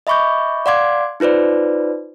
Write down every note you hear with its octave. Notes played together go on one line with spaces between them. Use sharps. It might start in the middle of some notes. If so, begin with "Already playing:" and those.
D#5 E5 B5 C#6 D6 G6
D5 F5 F#5 C6 D6 G#6
D#4 F4 B4 C5 D5